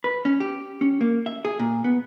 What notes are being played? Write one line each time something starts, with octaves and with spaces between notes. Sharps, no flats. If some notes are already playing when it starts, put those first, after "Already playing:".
B4
C#4
G4
C#4
A#3
E5
G#4
A#2
B3